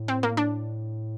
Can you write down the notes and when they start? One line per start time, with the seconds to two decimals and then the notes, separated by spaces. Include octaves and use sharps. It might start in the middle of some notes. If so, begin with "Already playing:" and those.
Already playing: A2
0.08 C4
0.23 A#3
0.37 D4